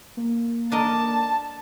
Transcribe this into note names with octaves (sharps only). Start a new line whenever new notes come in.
A#3
D4 A#4 D#5 A5